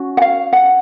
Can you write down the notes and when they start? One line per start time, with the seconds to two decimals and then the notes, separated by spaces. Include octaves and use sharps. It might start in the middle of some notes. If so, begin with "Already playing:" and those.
Already playing: C#4 F#4
0.17 F#5
0.22 F5
0.53 F#5